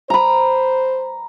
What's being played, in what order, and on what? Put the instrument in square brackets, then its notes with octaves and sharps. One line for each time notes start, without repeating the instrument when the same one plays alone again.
[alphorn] C5 [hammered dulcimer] A#5 B5